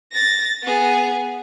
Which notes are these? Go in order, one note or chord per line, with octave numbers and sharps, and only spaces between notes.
A6 A#6
B3 G#4